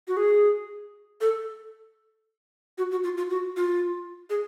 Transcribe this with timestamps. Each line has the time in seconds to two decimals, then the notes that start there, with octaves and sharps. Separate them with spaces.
0.08 F#4
0.17 G#4
1.21 A4
2.78 F#4
2.91 F#4
3.03 F4
3.17 F4
3.30 F#4
3.56 F4
4.30 G#4